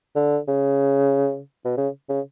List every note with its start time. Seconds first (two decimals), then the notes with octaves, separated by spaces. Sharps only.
0.15 D3
0.48 C#3
1.65 B2
1.77 C#3
2.09 C#3